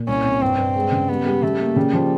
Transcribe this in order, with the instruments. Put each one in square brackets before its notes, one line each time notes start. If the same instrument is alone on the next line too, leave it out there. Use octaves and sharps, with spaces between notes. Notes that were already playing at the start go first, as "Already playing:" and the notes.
Already playing: [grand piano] A#2
[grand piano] C2 [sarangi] C#4
[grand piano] C3
[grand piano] G2 [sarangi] C4
[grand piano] G2
G#3
C#3
[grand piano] G3 [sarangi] B3
[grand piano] G3
[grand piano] C#3 [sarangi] A3
[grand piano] A#3
[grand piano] C#3 [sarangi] G3
[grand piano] F3